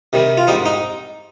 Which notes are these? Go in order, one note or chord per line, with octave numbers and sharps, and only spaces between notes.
C3 D#3 G3
F4
G#2 G3 C4 D#4
D#4